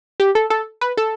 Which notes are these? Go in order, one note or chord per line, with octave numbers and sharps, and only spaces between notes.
G4
A4
A4
B4
A4